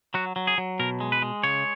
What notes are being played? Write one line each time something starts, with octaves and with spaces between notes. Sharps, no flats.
F#3 F#4
F#3
G#4
F#3
B2 A#4
G#3
B4
G#3
C#3 C#5